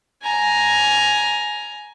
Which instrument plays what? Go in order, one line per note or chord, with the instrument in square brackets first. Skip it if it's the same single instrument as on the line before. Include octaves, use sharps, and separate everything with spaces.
[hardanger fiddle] G#5 A#5